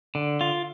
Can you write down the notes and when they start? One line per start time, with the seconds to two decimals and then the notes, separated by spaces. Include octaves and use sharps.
0.15 D3
0.41 F4